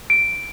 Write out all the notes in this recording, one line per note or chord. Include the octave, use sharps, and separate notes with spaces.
D7